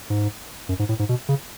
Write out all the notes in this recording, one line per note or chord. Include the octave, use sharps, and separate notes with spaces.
G#2
F#2
G#2
A2
G#2
B2
C#3